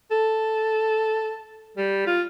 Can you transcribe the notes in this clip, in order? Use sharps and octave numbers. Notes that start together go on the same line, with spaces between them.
A4
G3
F4